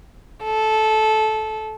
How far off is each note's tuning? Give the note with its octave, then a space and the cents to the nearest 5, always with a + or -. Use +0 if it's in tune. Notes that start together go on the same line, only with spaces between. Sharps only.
A4 -15